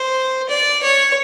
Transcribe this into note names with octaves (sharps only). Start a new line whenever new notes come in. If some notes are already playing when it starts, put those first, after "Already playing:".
Already playing: C5
D5
C#5